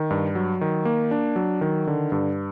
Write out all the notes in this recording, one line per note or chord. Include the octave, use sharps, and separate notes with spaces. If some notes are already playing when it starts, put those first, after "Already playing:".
Already playing: D#3
G2
F#3
D#3
A#3
D4
F#3
D#3
D3
G2